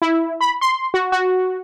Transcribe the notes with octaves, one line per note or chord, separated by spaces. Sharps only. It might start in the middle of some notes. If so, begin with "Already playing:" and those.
E4
B5
C6
F#4
F#4